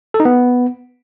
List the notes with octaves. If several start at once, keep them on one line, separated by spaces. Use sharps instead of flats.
A4
D#4
B3